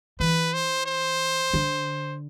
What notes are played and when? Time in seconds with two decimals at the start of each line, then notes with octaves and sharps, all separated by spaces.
0.20 E3 B4
0.54 C5
0.86 C5
1.54 D3